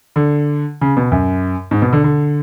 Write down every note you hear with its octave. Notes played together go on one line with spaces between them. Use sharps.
D3
C#3
B2
F#2
G#2
B2
D3
D3